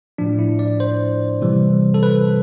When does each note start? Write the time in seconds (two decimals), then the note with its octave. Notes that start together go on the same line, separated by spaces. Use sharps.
0.18 A2 F3 D4
0.39 E4
0.59 D5
0.80 C5
1.41 C3 E3 G3
1.94 A4
2.03 B4